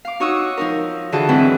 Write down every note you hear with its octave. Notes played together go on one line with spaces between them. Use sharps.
F5 D6
D#4 F#4 C#5 C#6 D#6 E6
F3 D#4 A#4
D3 E3 F4 F#4 G#4 A5
G#2 E3 F#3 C4 E4 G#4